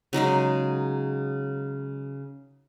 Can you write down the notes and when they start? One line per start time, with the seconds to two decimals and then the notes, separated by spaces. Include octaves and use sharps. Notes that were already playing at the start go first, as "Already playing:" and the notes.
0.13 C#3 F#3 G#3 D#4